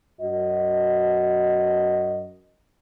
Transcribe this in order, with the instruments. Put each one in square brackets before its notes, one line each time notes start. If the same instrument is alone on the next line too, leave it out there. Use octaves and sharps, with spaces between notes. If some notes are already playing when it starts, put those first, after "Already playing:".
[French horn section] F#2 F#4 D#5